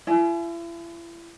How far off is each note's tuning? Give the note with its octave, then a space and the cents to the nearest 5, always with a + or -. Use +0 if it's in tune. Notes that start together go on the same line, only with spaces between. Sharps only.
E4 +40 G#5 +35